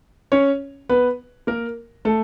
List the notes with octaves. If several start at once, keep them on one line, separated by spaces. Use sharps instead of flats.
C#4 C#5
B3 B4
A#3 A#4
A3 A4